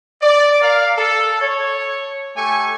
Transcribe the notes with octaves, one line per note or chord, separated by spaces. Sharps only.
D5
A#4 D5 F5
A4
C#5
A3 G4 A4 G#5 C#6